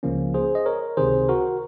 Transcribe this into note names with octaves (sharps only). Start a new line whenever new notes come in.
C#2 C#3 F3 A#3 C#4
G#4 C5
D#5
A#4 C#5
C#2 C3 D#3 G#4 C5
F#4 A#4